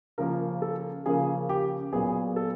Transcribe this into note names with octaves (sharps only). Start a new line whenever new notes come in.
C#3 F3 A#3 A#4
A4
C#3 F3 A#3 G#4
G4
A#2 F#3 B3 G#4
A4